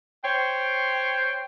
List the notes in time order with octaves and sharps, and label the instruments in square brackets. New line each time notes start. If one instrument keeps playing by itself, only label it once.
[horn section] C5 C#5 G5